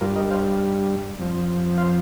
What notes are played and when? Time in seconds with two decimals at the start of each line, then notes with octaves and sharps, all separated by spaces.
0.01 G2 G3 F4 A#4
0.16 A#4 D#5
0.30 C5 F5
1.19 F2 F3
1.78 C5 F5